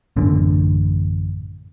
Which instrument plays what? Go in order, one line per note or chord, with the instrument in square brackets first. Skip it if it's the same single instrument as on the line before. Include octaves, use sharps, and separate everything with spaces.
[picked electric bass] A1 F#2 D3